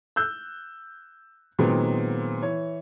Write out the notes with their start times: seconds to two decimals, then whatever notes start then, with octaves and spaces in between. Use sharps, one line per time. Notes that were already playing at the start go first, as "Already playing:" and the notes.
0.16 E6 F#6 G6
1.59 A#2 D#3 F#3 G#3 B3 C4
2.42 E3 C#5